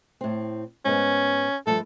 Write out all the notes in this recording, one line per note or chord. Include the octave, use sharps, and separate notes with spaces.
A2 C4
G#2 B3 C#4
G2 F3 A3 A4